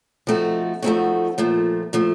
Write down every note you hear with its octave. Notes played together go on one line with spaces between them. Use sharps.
F3 A3 C4 D#4 F#4
F3 A3 C4 D#4 F#4
A#2 F3 A3
A#2 F3 A3